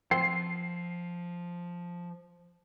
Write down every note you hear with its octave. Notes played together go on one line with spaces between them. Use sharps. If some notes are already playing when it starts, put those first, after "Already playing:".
F3 C4 C7